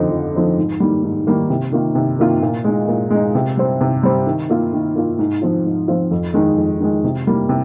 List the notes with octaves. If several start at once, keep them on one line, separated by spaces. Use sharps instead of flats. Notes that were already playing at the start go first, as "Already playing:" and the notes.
Already playing: F2 D3 F3 C4 D#4
F2
D3 F3 C4 D#4
G#2
D#3 G3 A#3
G#2
D#3 G3 A#3
C3
D#3 A#3 F4
C3
D#3 A#3 F4
A#2
G#3 D#4
A#2
G#3 D#4
C3
G3 C4
C3
G3 C4
D#3
A#3 F4
D#3
A#3 F4
G#2
F3 C4 F4
G#2
F3 C4 F4
F2
D#3 G#3
F2
D#3 G#3
C3
G3 A#3
C3